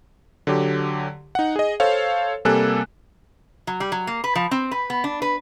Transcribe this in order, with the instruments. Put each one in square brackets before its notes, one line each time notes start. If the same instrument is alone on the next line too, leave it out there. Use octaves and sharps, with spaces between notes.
[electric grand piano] D3 F#3 G4
D#4 F#5
G#4 D#5
A4 C5 C#5 F5
C3 G3 A#3 A4 G#5 F#6
[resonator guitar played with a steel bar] F#3
G3
F#3
A#3
B4
F3
C4
B4
B3
D4
B4